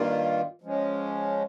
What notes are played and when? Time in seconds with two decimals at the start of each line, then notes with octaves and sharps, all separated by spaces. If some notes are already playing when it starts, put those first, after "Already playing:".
Already playing: G2 D#3 G3 A#3 F4
0.62 F3 G#3 C#4